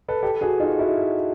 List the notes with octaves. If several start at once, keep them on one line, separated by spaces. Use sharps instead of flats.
A4 B4
G4 A4
F#4 G#4
D#4 F4
E4 F#4